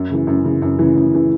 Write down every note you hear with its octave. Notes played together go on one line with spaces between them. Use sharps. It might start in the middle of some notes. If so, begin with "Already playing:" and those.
Already playing: F#2
C#3 E3
F#2
C#3 E3
F#2
C#3 E3
F#2
C#3 E3